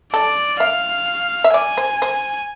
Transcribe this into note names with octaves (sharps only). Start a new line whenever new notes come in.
A4 D5
E5 F5
E5
D5 G#5
C5
C5